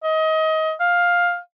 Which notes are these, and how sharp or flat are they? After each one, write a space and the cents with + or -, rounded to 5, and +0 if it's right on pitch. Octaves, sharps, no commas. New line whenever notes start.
D#5 +25
F5 +10